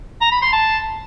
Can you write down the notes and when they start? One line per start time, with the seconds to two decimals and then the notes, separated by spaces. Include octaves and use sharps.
0.21 A#5
0.31 B5
0.42 C6
0.53 A5